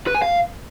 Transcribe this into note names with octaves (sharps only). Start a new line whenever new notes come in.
B4
G#5
F5